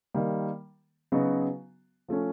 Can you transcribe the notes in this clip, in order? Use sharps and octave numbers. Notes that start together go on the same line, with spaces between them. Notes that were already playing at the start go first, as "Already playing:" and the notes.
D#3 G3 A#3
C#3 F#3 B3 D#4 F#4
F3 A3 C#4